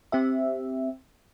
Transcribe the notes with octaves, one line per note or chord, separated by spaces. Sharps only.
C4 G4 E5